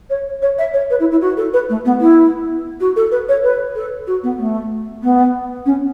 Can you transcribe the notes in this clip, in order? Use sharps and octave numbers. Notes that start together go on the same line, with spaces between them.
C#5
C#5
E5
C#5
B4
E4
E4
F#4
A4
B4
A3
B3
E4
F#4
A4
B4
C#5
B4
A4
F#4
B3
A3
B3
C#4